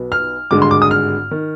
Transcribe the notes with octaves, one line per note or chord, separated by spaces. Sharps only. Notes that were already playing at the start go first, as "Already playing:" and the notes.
Already playing: B1 B2 B3
F6
G#1 G2 D3 G#3 D6
C6
D6
D#6
F6
D#3